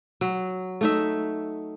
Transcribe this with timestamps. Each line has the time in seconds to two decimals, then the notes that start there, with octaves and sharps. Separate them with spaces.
0.21 F#3
0.81 A3 D#4 E5